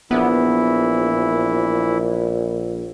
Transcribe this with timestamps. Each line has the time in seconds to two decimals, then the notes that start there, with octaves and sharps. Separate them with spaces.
0.11 A#1 E3 B3 E4